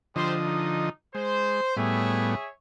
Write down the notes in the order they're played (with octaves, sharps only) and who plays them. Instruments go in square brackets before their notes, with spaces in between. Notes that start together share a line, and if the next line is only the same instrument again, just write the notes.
[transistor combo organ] D3 F3 D#5 [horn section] G3 C5
[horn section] D#4
[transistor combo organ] G#3 [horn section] C5
[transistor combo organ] A2 G3 B3 [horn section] G#4 C#5 E5